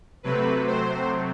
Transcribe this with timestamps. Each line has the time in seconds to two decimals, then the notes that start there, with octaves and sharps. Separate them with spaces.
0.23 C3 F#3 A3 C4 B4
0.67 C5